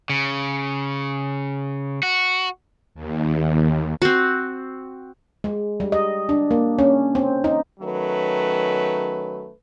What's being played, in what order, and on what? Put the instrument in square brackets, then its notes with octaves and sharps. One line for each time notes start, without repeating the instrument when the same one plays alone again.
[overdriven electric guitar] C#3
F#4
[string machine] D#2
[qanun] C4 F#4
[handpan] G#3
G3
D#5
D4
A#3
C#4
C4
D#4
[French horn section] D#3 F#3 A3 C#4 B4